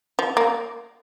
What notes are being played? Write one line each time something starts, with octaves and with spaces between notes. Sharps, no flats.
F3
A#3